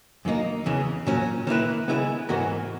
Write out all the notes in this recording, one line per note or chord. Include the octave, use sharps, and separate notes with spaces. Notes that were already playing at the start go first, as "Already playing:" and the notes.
F#2 D#3 A#3 D#4
E2 C#3 E3
A#2 F#3 C#4
D#3 A#3 E4 B4
C#3 G#3 B3 E4 B4
G#2 E3 B3 F#4 A#4